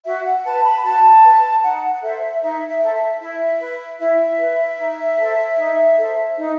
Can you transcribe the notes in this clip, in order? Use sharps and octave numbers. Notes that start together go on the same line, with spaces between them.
F#4 E5
F#5
B4 A5
B5
F#4 A5
B4
D#4 F#5
F#5
A4 C5 E5
D#4 E5
E5
A4 C5
E5
E4 E5
B4
E4 E5
B4
D#4
A4 C5
D#4
A4 C5
D#4